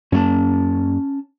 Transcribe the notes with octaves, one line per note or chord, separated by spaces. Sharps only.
F#2 A#3 C#4 D4 A5